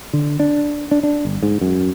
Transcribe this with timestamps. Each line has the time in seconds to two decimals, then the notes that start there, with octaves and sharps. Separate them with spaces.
0.13 D3
0.40 D4
0.91 D4
1.03 D4
1.25 G1
1.43 G#2
1.61 F#2